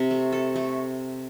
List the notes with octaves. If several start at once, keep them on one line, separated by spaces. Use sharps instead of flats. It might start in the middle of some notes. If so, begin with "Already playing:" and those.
Already playing: C3
A3
A4
A3